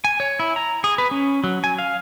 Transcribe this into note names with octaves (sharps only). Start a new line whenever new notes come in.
G#5
C#5
E4
A#5
G#4
B4
C#4
F#3
G#5
F5